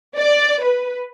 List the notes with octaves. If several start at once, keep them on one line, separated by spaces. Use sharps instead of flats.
D5
B4